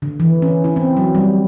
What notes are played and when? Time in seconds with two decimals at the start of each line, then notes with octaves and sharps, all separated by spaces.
0.02 D3
0.20 E3
0.42 C#4
0.64 E4
0.76 C4
0.97 F#3
1.15 G3